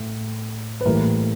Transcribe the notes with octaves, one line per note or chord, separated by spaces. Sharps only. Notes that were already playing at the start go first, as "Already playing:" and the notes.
Already playing: A2
B4
A2 E3 G3 A#3 A#4